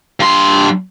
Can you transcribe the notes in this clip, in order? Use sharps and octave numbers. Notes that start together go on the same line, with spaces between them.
G2 C6